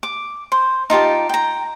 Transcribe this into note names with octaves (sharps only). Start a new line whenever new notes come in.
D6
C5
D#4 F4 G4 A5
G5 A#5